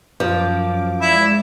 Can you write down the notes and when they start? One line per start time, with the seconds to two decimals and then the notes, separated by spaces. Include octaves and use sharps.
0.20 F#2 F3 D6
1.01 G#3 E4 D5 E5